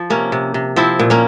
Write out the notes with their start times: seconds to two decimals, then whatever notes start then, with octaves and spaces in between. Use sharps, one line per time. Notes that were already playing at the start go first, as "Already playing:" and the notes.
Already playing: F3
0.10 C3 A#3 C#4
0.32 C3
0.54 C3
0.76 F3 C4 E4
0.99 A#2
1.10 A#3 C#4